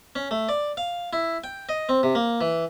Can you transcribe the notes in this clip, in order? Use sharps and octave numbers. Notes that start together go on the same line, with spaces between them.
C#4
A3
D5
F5
E4
G5
D#5
C4
C3
A#3
E3